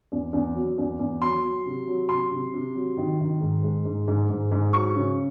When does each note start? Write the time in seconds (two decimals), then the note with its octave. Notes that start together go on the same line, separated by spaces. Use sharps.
0.12 E2
0.33 E2
0.55 F#3
0.78 E2
0.99 E2
1.21 F#3 C6
1.44 F#3
1.66 C3
1.87 F#3
2.09 C3 C6
2.31 C3
2.54 C3
2.75 F#3
2.97 D#3
3.20 D#3
3.41 G#2
3.63 G#3
3.85 G#2
4.08 G#2
4.30 G#2
4.51 G#2
4.73 F#3 C#6
4.95 C#3